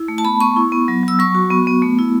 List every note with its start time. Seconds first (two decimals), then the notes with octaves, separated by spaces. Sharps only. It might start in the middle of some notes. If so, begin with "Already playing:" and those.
Already playing: E4
0.08 A3
0.18 A5
0.24 B3 B5
0.40 B3 C#6
0.56 E4
0.72 B3
0.88 F#3
1.03 F#3 E6
1.19 F#3 C#6
1.35 F#4
1.50 B3
1.67 B3
1.82 A3
1.98 E4